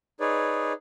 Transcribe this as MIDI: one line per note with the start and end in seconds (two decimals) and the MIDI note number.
0.20 0.73 63
0.20 0.73 68
0.20 0.73 71
0.20 0.73 73
0.20 0.73 74